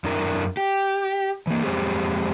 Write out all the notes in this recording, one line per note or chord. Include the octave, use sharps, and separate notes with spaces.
F#2 D4 E4 A#4
G4
E3 A#3
F2 C#3 G#3 C4 G4 G#4